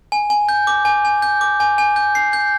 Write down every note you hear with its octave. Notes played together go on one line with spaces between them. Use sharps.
G#5
G#5
G6
D6
G#5
G#5
G6
D6
G#5
G#5
G6
C7
G6